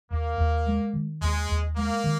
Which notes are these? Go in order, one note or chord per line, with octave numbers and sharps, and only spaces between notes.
D#2 A#3
D#2
G#3
D#3
D#2 G#3
D#2
G#3 A#3
D#3